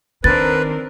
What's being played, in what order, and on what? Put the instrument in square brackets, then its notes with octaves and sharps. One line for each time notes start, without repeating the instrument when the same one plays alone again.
[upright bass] D#3 [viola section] C4 D4 A#4 [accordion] B4 [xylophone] A6